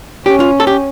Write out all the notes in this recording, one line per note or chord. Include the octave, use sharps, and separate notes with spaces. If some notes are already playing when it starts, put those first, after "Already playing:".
C#4 G4
F4
A4
G4